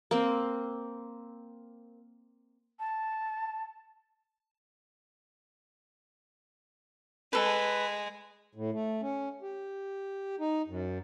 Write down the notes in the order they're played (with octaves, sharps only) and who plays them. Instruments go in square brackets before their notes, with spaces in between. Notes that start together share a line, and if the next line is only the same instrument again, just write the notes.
[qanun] A#3 C4
[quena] A5
[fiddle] G#3 [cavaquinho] A4 B4
[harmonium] A2
A3
C#4
G4
D#4
F#2